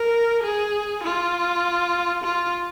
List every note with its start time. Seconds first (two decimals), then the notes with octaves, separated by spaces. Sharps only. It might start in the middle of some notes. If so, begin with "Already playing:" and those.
Already playing: A#4
0.43 G#4
1.03 F4
2.24 F4